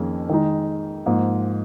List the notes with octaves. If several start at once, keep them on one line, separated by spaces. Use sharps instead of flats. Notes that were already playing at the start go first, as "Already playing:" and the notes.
Already playing: F2 D#3 A#3 C#4 G#4
D#3 G#3 D#4
G#2 F3 A#3